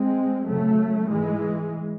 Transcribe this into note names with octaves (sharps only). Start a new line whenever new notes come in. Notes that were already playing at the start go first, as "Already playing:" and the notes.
Already playing: G#3 C4
F#2 C#3 F#3 A3
G#2 E3 G#3